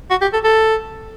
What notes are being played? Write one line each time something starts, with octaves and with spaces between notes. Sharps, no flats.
F#4
G4
A4
A4